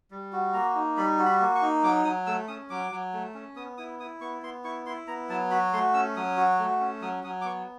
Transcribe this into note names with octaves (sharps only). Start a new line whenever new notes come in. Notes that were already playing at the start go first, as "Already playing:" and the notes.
G3
F#4
A#3 A#5
D#4
G3 B5
F#4
B5
A#3
C#6
D#4
F#3 D6
F#3 D#6
A3 E6
C#4 D#6
F#3 D6
F#3
A3
C#4
B3 D#6
E4 D#6
E4 D#6
B3 C#6
B3 C6
E4 C#6
E4 C6
B3 A#5
F#3 A5
F#4 B5
A3 C6
C#4 E6
F#3 D#6
F#4
A3
C#4
F#3 D#6
F#3 D#6
D6
B3 C#6